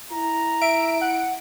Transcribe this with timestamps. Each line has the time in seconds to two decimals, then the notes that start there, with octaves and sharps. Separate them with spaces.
0.12 E4 A#5
0.62 E5 D7
1.01 F#5